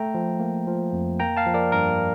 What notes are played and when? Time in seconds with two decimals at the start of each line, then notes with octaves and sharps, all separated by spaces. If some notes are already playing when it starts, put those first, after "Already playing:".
Already playing: A3 G5 A#5
0.14 F3
0.40 A#3
0.67 F3
0.93 F2
1.19 A#3 G5 A#5
1.37 F5 A5
1.46 F3
1.54 A#4 D5
1.72 G2 A#4